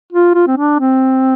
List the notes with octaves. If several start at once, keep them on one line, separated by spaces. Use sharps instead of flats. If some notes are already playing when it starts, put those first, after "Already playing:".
F4
F4
C4
D4
C4